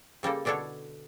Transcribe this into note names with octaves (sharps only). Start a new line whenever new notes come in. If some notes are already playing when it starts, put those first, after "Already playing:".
C#3 G3 A#3 A4
B2 D3 D4 E4 A4 C#5